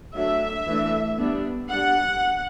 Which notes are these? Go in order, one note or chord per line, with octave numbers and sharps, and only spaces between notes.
F#3 A3 D4 E5
E3 A3 D4
G3 B3 D4
G3 D4 F#5